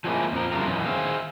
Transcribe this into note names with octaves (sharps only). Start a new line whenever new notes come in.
F3 F#3 G#3 A#3 C#4 E4
F2 F3 A#4
C#3 G3 D4 E4 F4 A#4
F#2 B2 E3 F#3
D#3 G#4 C5 E5 F5